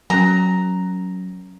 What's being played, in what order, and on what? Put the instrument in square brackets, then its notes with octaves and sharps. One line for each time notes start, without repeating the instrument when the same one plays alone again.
[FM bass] F#3 [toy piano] C#4 A#4 [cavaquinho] A#5